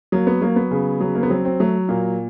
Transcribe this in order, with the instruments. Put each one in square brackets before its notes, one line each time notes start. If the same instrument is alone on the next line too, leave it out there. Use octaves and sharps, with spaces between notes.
[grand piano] F#3 A#3
B3
F#3 A#3
B3
C#3
F#3
A#3
B3
F#3 C4
C4
F#3 A3
A#2 A#3